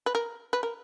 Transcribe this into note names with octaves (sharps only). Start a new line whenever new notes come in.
B4
A#4
B4
A#4